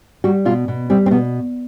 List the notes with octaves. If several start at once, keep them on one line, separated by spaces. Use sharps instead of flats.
G3 F#4
B2 F4
B2
G3 C4
C4
B2 B3